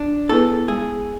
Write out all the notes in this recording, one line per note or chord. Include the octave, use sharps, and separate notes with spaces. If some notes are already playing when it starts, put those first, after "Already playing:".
Already playing: D4
B3 E4 G#4 A4 B4
G#3 G#4